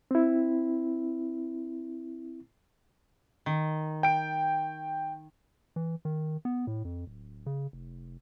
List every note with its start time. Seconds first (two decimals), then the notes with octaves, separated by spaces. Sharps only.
0.11 C4 E4
3.46 D#3
4.03 G5 D7
5.76 E3
6.05 D#3
6.45 B3
6.67 A2
6.85 F2
7.07 D1
7.46 C#3
7.73 F1